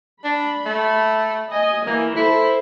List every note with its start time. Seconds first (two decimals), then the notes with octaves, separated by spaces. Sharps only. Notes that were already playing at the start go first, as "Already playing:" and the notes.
0.24 D4 B5
0.65 A3
1.53 D#5 G#5
1.87 E3 A#3
2.16 E4 A4 C5